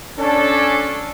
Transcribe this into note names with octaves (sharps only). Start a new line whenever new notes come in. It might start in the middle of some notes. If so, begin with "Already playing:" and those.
C#4 D4 A4